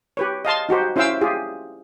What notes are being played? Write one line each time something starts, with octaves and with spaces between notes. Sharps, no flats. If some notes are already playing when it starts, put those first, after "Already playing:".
G4 B4 C#5
D#5 F5 A5 C6
D#4 F#4 G4 C5
C#4 E4 C5 F5 G5 E6
F4 G4 G#4